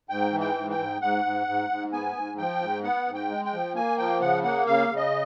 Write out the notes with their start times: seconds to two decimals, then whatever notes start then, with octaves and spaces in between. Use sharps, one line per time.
0.10 G#2 G5
0.32 E3
0.40 G5
0.55 G#2
0.71 G5
0.78 G#2
1.01 G#2 F#5
1.24 G#2
1.47 G#2
1.70 G#2
1.92 B3 G#5
2.16 G#2
2.38 F3 G5
2.61 G#2
2.84 B3 F#5
3.07 G#2
3.14 G5
3.30 G#3
3.45 G5
3.53 F3
3.75 A#3 G#5
3.98 F3 G5
4.21 C#3 F#5
4.43 A#3 F#5
4.67 C#3 F5
4.89 C#3
4.97 D#5